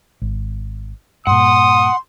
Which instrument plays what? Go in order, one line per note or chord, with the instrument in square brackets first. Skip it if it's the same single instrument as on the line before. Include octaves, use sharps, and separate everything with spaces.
[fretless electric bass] G#1
[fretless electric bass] G2 A#2 [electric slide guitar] F#5 [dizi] C6 [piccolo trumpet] D#6